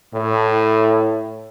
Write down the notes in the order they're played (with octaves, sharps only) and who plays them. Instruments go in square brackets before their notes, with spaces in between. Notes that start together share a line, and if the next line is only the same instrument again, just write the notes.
[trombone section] A2